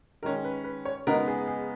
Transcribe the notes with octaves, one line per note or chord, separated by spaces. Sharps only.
D#3 G#3 C#4 A#4
B4
B4
C#5
C#3 G#3 B3 D#4 A#4
G#4
G#4